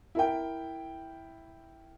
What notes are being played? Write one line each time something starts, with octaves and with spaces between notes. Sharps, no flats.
E4 A#4 G5